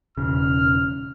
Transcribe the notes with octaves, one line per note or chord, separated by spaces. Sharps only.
E1 C#3 F6